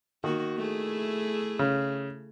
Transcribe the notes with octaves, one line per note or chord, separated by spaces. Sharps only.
D#3 A#3 F#4
A3 E4 G#4
C#3